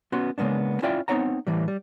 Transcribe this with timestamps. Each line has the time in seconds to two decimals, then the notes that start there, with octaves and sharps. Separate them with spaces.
0.12 B3 C#4 F#4 C6
0.38 C#3 G#3 A#3 B3 D4
0.82 C#4 E4 F4 D5 E5 G5
1.08 B3 C4 D#4 C#5 F#5 A#5
1.47 A2 E3 G3
1.68 G3